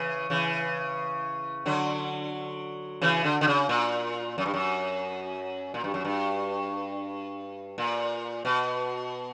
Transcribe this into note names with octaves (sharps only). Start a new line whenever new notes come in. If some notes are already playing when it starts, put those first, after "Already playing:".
Already playing: C#3 E3
C#3 E3
D3 F#3
C#3 E3
D3
D3
C#3
A#2
F#2
G2
F#2
A#2
G2
F#2
G2
A#2
B2